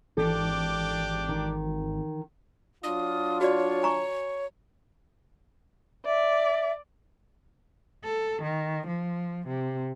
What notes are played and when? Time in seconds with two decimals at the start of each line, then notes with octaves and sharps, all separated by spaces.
0.17 G#1 E3 D4 G4 A4 D6
1.29 D#3
2.83 F#3 D4 F4 D#6
3.41 F#4 C#5 D5
3.83 G#5 A#5 C#6
6.05 D5 E5
8.04 A4
8.42 D#3
8.87 F3
9.47 C3